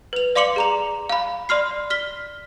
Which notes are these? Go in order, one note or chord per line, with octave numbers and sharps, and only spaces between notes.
B4 F7
D5 F5 C6 D6 C#7 F#7
G#4 A#5 F7
F5 B5
D5 C6 F6 C7
F6 B6 G7